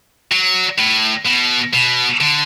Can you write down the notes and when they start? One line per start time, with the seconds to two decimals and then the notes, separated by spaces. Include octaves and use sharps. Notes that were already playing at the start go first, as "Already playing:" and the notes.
0.31 F#3
0.79 A2
1.26 B2
1.74 B2
2.21 D3